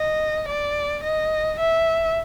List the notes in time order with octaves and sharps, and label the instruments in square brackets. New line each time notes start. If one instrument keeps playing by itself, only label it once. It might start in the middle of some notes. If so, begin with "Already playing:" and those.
Already playing: [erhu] D#5
D5
D#5
E5